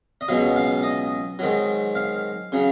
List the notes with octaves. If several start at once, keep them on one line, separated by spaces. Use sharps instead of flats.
D#5
C#2 B2 F#3 F5
F5
D#5
G#2 D#3 F#3
F5
C#3 F#3